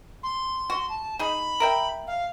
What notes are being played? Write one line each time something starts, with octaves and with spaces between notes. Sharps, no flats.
C6
F#4
A5
D#4 G#4 B5
A#4 E5 G5
F5